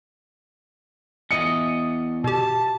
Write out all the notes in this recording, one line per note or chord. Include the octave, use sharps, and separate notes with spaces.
E2 D#5 C#7
B2 G4 A5